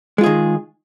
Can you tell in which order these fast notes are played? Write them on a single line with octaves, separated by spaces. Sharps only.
G#3 F4 G#4 D#3